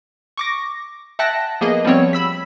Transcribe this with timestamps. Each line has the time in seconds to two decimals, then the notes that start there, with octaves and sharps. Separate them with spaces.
0.37 C#6 D6 A#6
1.19 E5 F#5 G5 A5 F#6 A#6
1.61 F3 A#3 B3 G#4 D#5
1.85 F3 G3 B3 C4 C#5
2.13 B5 E6 B6